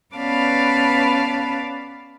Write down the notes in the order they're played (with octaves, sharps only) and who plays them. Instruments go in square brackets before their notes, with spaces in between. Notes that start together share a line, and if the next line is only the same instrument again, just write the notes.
[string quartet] B3 C#4 B4 D5 F5 A5